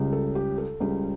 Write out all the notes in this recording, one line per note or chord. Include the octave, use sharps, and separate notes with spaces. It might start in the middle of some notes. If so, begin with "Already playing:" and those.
Already playing: C#2 C#3 G3
A4
G4
A4
C#2 C#3 G3